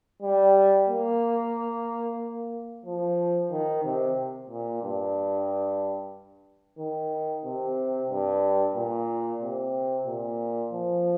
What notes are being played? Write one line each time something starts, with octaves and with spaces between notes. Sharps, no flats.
G3
A#3
F3
D#3
C3
A#2
G2
D#3
C3
G2
A#2
C3
A#2
F3